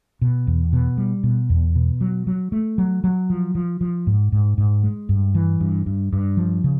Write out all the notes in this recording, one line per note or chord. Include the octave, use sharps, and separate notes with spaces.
B2
E2
B2
G3
B2
E2
B2
F#3
F#3
A3
F#3
F#3
F3
F3
F3
G#2
G#2
G#2
G#3
G2
E3
G2
G2
G2
F3
C#3